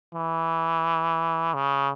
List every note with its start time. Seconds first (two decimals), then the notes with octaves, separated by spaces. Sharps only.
0.14 E3
1.54 C#3